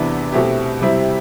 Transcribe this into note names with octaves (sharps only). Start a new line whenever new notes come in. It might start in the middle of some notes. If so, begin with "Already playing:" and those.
Already playing: E2 C3 E3 B3 D4
B2 A3 C4 E4 G4
C3 G3 C4 E4